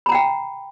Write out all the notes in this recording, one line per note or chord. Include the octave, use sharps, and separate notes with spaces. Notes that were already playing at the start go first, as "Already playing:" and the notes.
F#5 G5 A#5 B5